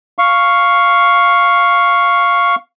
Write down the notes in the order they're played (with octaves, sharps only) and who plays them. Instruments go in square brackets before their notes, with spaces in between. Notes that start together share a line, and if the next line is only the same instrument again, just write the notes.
[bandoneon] F5 C#6